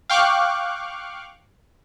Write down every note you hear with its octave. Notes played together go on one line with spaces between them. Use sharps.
F5 G5 C#6 D6 F6 F#6